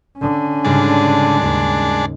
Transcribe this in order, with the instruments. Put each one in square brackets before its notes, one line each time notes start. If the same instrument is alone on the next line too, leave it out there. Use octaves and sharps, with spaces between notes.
[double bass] D3 C#4
[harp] G#2 C#3 G3 [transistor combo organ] G#3 D4 A5
[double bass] D#2